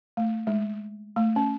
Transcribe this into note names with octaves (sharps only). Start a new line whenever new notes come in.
A3
G#3
A3
C#4